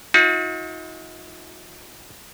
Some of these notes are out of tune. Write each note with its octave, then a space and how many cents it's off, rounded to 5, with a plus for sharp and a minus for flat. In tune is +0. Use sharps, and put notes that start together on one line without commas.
D#4 +40 F#4 -45